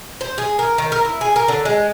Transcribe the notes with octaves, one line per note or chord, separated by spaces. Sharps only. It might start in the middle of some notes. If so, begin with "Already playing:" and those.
C5
G#4
A#4
D#3
A#4
E4
G#4
A#4
D3
G#3